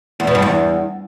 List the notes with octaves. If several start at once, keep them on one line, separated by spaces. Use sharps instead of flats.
E2
B2
G2
E2